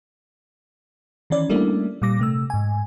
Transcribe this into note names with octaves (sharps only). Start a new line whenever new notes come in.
D#3 E3 C#4 D5
G3 A3 A#3 C#4 D4 E4
A#2 G3 D6 A#6
C3 A3 E6
G#2 G#5